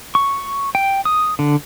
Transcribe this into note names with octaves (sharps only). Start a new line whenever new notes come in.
C#6
G5
D#6
D3